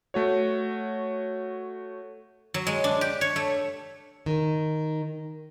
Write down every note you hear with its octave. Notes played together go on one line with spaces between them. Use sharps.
A3 F#4 C#5
F#3
G#3
D4
G4
C#5
A3
D#3